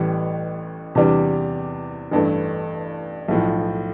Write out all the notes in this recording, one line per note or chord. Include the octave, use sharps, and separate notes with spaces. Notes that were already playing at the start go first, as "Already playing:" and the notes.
Already playing: A1 A2 E3 G3
E2 C3 E3 G3 D4
A1 G2 E3 A3
B1 A2 F3